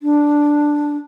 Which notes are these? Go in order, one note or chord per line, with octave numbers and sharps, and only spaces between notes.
D4